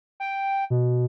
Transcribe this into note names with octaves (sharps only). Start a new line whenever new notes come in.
G5
B2